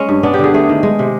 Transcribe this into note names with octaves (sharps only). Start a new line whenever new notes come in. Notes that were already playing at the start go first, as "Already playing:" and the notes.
Already playing: G#3 C#4
G2
B3 D4
G4
D3 G#4
A3 G#4
D#3
G#3
C3